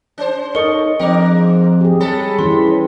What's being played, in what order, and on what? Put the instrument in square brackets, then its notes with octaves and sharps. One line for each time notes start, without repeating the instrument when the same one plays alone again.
[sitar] C#4 C5
[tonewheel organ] D#4 A4 C#5 [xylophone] A#4 C#6 C#7 [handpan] D#5
[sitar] G#2 D4 A#4 [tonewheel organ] F3 C4 [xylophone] G5 D6
[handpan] G4 G#4
[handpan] G3 [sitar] G#3 A4 [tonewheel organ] C#5 B5
[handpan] E3 C#4 G4 [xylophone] C6